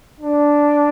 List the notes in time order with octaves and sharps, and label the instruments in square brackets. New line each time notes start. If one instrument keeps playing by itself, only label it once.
[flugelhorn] D4